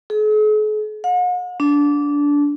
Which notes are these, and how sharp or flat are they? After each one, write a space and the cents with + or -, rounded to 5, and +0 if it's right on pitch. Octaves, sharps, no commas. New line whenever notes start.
G#4 +45
F#5 -45
D4 -20